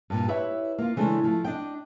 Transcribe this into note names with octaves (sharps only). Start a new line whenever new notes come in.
G2 A#2
E4 G4 B4 C#5 E5
A#3 F4
C#3 E3 G#3 A3 D4
F3 A3
D4 D#5 G5